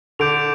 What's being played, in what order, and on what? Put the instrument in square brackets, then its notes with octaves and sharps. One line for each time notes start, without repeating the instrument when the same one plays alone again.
[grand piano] D3 [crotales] D6 G6 D7 F7